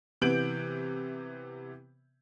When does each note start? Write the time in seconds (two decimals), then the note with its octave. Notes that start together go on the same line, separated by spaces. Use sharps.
0.21 C3 E3 B3 G6 D7 F#7